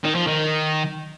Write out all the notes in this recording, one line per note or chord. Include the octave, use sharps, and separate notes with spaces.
D#3
F3
D#3